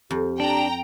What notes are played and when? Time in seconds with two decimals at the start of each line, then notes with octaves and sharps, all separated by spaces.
0.11 F2 G4
0.40 D4 G5 A#5